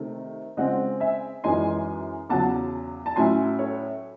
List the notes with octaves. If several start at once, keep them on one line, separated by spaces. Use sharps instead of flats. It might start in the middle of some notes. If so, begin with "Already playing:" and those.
Already playing: C3 D#3 A3 C4
C#3 G#3 C4 D#5 F#5
E5 G#5
F#2 E3 G#3 D#4 G#5 C6
E2 C#3 F#3 F#5 A5
A5
A2 F#3 C#4 E4 G#5 C6
A4 C#5